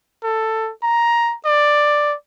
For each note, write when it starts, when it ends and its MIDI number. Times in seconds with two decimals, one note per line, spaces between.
0.23 0.70 69
0.83 1.34 82
1.45 2.14 74